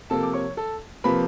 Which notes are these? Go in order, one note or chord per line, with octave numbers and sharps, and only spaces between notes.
C3 F3 A#3 A4 A5
D6
C#5 C#6
A4 A5
C3 F3 A#3 B4 B5